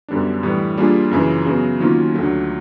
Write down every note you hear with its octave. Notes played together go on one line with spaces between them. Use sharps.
F#2 D3 G3 B3 D4
A2 E3 G3
G3 A#3 D4 F4 G#4
F#2 C#3 E3
C#3 F#3 B3
D#3 F#3 A#3 C#4 F4
D2 D3 F#3 A3